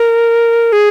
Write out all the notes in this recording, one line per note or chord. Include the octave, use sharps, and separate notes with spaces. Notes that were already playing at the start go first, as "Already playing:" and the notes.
Already playing: A#4
G#4